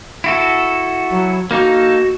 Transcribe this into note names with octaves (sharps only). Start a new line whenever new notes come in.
E4 F#4 A4
F#3
A#3 D#4 F#4 A4